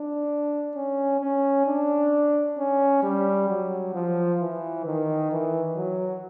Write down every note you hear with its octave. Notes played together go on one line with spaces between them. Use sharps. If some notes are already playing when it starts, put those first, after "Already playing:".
Already playing: D4
C#4
C#4
D4
C#4
G3
F#3
F3
E3
D#3
E3
F#3